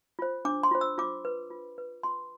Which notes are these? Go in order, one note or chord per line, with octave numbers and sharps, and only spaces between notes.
F4 C5
D4 D6
C6
F4 C5
E6
F4 D6
B4
F4
B4
F4 C6